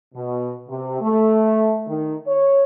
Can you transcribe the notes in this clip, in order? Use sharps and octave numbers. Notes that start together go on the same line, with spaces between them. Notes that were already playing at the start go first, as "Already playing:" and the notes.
B2
C3
A3
D#3
C#5